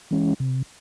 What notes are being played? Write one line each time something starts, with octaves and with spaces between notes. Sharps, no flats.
E3 G#3 C#4
C3